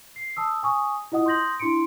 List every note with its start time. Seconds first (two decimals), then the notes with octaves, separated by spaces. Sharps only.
0.16 C7
0.37 A5 D#6 E6
0.63 G#5 C#6 D#6
1.12 E4 F4 D#5 F#5 D#6
1.26 C6 D#6 G6 A#6 F#7
1.60 D4 E4 C6 C#7 D7